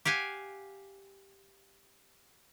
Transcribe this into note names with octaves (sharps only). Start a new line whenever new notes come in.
G4 F5 F#5 G#5